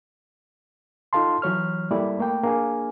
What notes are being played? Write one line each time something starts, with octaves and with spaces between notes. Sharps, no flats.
D#4 F4 A4 F5 A5 C6
E3 F#3 C#5 F6
G3 A#3 E4 A4 D5
A3 A#3 G5
A#3 D4 G#4 F5 G#5